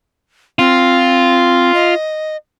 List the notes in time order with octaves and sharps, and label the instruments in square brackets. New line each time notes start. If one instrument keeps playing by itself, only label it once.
[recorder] C4 [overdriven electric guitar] F4
[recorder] D#5